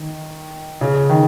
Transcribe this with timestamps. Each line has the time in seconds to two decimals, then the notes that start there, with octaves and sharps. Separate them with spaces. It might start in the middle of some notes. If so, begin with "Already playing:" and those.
Already playing: D#3
0.81 C#3
1.09 D#3